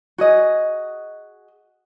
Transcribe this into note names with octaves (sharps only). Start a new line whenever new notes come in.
F#4 G#4 D#5